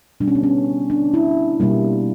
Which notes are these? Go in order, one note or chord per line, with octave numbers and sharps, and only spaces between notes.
B2 G3 B3 D4
C#4
B3
C#4
D4
E4
B2 G3 A#3